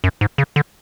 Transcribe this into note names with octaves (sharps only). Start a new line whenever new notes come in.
F#2
G#2
C#3
D3